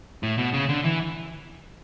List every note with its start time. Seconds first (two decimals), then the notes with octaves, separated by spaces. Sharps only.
0.23 A2
0.38 B2
0.53 C#3
0.69 D3
0.84 E3